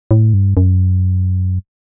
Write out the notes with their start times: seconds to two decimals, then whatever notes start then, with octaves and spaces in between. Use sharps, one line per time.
0.11 A2
0.34 G2
0.57 F#2